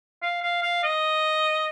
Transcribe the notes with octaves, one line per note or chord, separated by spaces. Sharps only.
F5
F5
F5
D#5